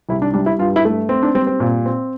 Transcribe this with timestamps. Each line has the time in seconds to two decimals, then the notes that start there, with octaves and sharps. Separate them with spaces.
0.09 C2 E4
0.22 D4
0.34 G3 D4
0.46 E4
0.59 G2 F4
0.76 E4
0.85 A3
1.09 C4
1.23 D4
1.34 G3 C4
1.47 C4
1.60 A#2
1.86 C4